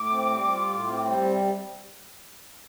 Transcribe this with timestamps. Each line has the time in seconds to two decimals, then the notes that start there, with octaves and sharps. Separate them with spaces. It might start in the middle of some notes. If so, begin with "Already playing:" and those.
Already playing: A2 D6
0.11 C4
0.31 G3
0.49 F4
0.68 A2
0.88 C4
1.05 G3
1.25 C3